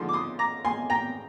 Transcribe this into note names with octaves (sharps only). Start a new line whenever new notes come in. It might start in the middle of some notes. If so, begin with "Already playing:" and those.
Already playing: D3 F3 G#3 D#4 C6
D6
C6 D#6
A#5 D6
G#5 C6
G5 A#5